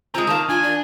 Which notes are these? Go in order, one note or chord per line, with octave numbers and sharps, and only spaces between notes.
G#3 C4 F4 A#5
D#3 A#3 A5
D4 F4 G#5
D5